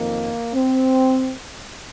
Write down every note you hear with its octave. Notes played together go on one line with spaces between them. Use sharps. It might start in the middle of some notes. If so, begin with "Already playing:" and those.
Already playing: F2 D#3 A#3
C4